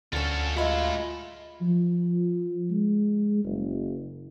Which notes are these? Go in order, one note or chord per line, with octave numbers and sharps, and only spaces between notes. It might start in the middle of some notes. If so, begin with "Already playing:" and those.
D2 D3 C#4 F4 A4
F#2 G#3 A3 F4 E5 B5
F3
G#3
F#1